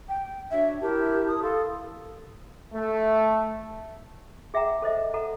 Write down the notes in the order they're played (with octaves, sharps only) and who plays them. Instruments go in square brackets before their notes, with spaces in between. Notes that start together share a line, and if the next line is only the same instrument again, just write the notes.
[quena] G5
[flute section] D4 F#4 C#5 [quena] E5
[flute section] E4 A#4 A5 [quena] G4
[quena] D#6
[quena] A4 [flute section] F5 C6
[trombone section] A3
[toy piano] G#4 E5 F#5 G5 A#5
A4 C5 D#5 E5
A4 F#5 A#5